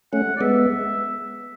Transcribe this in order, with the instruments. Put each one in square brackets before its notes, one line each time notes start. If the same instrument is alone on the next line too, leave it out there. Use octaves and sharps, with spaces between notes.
[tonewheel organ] A3 C#4 [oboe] F#5
[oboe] D5
[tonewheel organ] G#3 B3 [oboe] E5